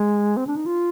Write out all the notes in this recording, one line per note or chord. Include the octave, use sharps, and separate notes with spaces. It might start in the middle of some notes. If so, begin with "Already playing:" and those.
Already playing: G#3
C4
D4
D#4
F4